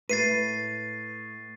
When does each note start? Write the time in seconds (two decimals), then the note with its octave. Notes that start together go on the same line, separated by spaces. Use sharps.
0.09 A2 B4 A6 C7 D#7